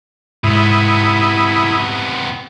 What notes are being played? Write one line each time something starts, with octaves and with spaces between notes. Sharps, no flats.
G#2 C3 B3 E4 B5 D#6